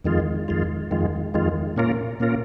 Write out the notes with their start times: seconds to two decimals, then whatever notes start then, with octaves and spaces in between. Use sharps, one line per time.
0.04 F2 D#3 G#3 F4
0.48 F2 D#3 G#3 F4
0.91 F2 D#3 G#3 F4
1.34 F2 D#3 G#3 F4
1.76 A#2 A#3 C#4 F4 A#4
2.20 A#2 A#3 C#4 F4 A#4